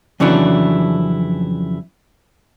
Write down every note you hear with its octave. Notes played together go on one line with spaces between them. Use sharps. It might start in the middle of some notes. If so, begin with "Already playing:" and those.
F2 C#3 E3 F#3 D4 E4